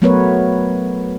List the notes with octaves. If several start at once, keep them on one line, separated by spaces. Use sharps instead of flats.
F#3 A3 B3 A#4 B4 C#5